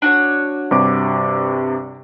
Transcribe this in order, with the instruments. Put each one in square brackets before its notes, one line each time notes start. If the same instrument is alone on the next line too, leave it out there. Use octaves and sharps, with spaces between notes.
[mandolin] D4 F#4 C#5
[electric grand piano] G2 C3 D6